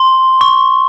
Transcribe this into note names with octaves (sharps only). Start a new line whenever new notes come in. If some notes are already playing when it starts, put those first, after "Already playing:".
Already playing: C6
C#6